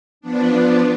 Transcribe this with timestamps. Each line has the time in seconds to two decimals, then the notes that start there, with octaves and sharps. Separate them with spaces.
0.21 F3 B3 D4